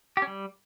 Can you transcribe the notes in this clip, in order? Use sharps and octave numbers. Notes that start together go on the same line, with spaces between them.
G4
C#4
G3